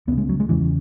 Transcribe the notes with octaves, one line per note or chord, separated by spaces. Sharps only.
C#2 C#3 B3
G#3
F#3
G#3
E2 C#3 E3